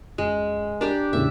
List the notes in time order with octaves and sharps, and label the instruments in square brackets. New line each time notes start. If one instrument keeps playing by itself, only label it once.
[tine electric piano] F#2 [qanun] G#3
[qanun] D4 G4 D5 [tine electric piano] A#4
[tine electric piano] E2 A2 C#3 [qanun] E5